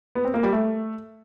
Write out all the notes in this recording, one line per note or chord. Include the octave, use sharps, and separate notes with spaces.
B3
C4
A#3
G3
A3